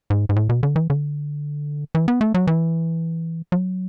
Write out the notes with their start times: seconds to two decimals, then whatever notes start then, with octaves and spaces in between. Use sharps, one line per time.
0.10 G#2
0.29 G#2
0.36 A2
0.49 B2
0.63 D3
0.76 E3
0.90 D3
1.95 E3
2.08 B3
2.21 A3
2.34 F#3
2.47 E3
3.52 F#3